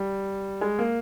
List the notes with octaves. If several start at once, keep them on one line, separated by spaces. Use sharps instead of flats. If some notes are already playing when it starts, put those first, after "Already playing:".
Already playing: G3
G#3
A#3